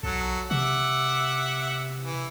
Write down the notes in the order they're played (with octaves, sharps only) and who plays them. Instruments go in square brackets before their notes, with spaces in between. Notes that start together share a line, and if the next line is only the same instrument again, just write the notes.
[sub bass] B1 [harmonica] F#3 A4
[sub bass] C3 [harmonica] E5 F#5 D6
[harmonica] E3